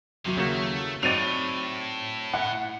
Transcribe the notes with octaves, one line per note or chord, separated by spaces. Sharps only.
D#2 C3 F#3 E4
C#3 A3 A#3 F#4
A2 F#3 C4 D#4 D5 A6 D#7 F7
E4 F#5